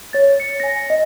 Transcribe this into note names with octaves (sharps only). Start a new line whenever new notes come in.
C#5 A6
C#7
G#5 A#6
D#5